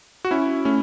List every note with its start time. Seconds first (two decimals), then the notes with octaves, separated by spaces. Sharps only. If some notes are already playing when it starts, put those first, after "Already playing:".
0.25 F#4
0.31 C#4 E4
0.65 A3 C#4